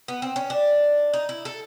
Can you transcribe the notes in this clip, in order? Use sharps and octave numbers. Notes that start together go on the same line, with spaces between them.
B3
C4
C#4
D4
D#4
E4
A4